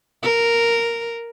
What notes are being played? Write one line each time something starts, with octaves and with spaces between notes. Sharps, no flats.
A#4